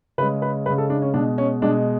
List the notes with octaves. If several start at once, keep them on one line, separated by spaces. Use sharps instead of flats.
C#3 G#3 B4
B4
C#3 G#3 B4
A4
D4
C#4
B2 G#3 D4
C#4
B2 G#3 D4